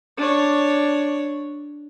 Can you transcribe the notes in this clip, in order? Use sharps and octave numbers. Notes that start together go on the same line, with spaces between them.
D4 C#5